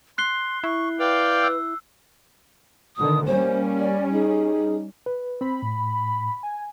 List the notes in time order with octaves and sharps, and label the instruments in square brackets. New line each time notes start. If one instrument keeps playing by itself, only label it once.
[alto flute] C6 [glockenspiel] F#6 C7 G7
[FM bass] E4 [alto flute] C#6
[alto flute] B4 [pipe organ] D5 F5 G5
[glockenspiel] E6
[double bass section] B2 D3 D#3 [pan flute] D#6
[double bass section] G3 C#4 [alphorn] A#3 [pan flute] C5
[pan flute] D5
[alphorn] D#4 [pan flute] G#4
[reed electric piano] B4
[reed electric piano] C4 [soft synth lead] B5
[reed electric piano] A2
[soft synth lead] G#5